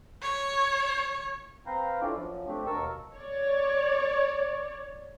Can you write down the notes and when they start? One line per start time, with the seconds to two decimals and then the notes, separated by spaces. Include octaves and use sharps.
0.22 C#5
1.66 C4 B4 F5 G5 A#5
2.01 C#4 D4 E4 F4 A4 D5
2.14 F#2 F3
2.47 A3 C4 D4 G4
2.67 D#2 B2 A#4 A5 C#6 E6
3.15 C#5 D5